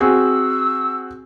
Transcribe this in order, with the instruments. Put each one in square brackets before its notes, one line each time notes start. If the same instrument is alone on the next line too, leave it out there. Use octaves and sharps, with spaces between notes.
[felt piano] C4 F#4 G#4 [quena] E6